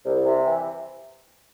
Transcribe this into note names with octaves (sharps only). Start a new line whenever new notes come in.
C2
C3
E3